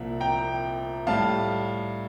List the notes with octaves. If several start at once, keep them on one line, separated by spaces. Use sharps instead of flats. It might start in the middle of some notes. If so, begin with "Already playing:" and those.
Already playing: C2 A#2 F3 E5
G5 A#5
A2 G3 F5 A5